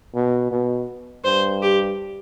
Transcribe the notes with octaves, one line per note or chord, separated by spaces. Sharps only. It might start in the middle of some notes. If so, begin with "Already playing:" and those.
B2
B2
G2 C5
G4